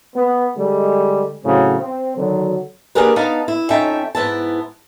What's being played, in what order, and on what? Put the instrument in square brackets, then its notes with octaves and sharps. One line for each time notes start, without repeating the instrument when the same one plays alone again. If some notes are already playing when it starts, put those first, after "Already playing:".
[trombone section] B3
D3 G3 G#3
A2 C#3 F#3 C4 F#4
C4
D3 D#3 F#3
[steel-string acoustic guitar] A#3 D4 G4 G#4 A#4 B4
B3 D#4 F5 A5
E4
F2 C#4 D#4 E5 G5 A5
G#2 B3 E4 A5